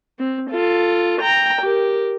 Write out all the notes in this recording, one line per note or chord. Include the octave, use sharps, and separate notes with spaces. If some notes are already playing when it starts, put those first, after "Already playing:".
C4
F4 A4
G5 A#5
G4 A#4